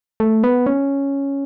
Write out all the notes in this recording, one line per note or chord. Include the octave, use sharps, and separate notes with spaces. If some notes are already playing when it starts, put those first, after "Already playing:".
A3
B3
C#4